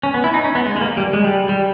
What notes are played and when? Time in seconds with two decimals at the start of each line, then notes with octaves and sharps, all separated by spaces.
0.03 C#4
0.14 B3
0.24 E4
0.34 D#4
0.44 C#4
0.55 B3
0.66 G#3
0.76 G#3
0.81 A#3
0.97 G3
1.13 G#3
1.24 G3
1.49 G3